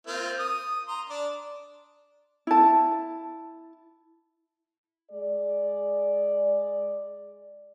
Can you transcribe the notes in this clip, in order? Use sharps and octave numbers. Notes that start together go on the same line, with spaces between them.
A#3 C4 F4
D#6
A#5 C6
D4 D5
E4 A5
G#3 G#4 D5